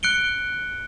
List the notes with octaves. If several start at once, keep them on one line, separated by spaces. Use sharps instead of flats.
F#6 C#7 D7 G7